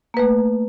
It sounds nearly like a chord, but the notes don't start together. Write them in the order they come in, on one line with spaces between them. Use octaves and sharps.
A#3 B4 A3